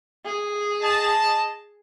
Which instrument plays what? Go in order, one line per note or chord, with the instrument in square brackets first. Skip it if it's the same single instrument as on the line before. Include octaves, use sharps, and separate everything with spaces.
[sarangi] G#4
[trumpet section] D#5 A5